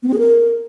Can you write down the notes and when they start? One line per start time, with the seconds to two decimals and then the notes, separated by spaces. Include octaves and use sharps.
0.03 B3
0.08 C4
0.13 G#4
0.19 A#4